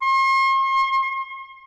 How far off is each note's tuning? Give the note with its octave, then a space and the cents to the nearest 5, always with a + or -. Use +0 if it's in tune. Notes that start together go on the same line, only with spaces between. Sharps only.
C6 +45